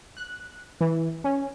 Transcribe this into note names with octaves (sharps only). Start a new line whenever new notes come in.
F#6
E3
C#4